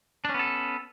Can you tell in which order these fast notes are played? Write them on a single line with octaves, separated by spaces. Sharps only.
D4 C#4 B3 A4